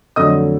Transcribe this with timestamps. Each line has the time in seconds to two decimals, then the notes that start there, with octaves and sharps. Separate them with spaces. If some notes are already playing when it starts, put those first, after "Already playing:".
0.16 F2 D3 F#3 A3 D#5 D#6